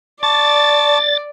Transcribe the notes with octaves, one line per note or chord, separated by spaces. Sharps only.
D5 A5 C#6 D6 A6